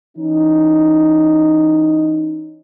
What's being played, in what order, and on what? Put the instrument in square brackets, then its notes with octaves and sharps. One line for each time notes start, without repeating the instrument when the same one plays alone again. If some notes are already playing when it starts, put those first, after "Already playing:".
[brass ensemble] E3 C#4 D#4